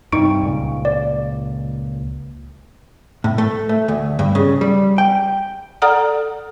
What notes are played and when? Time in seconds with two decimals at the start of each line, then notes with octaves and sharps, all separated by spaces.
0.12 G2 C3 D#4 C#6 D7
0.42 C#2 A#2
0.85 D5
3.24 A2
3.38 A3
3.69 A3
3.88 D2
4.19 G2
4.35 C#3
4.61 G3
4.98 G5
5.82 A4 D5 F#5 A#5 D#6 F6